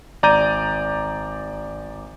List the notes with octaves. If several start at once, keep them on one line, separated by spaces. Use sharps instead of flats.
G#1 D5 A#5 G6 D#7